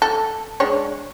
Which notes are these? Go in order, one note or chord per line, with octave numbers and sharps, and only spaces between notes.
A4
G#3 D4 C#5